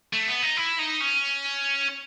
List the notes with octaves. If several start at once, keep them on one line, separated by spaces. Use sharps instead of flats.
A3
B3
D#4
E4
D#4
C#4